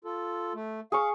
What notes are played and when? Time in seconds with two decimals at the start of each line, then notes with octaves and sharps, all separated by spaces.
0.05 F4 A4
0.55 A3
0.92 G#4 F5 C#6